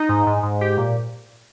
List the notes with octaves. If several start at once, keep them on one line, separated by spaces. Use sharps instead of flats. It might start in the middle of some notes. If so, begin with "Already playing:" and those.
Already playing: D#4
G#2
G#2
G#2
G4
A#2